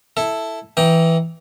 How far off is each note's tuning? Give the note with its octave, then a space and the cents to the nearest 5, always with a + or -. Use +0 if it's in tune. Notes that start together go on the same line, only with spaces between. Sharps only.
E4 +0 A4 +0
E3 +0 D#4 +15 G5 +0